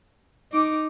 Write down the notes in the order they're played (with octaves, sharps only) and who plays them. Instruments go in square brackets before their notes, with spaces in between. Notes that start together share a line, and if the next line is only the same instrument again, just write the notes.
[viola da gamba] D#4 [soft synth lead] D6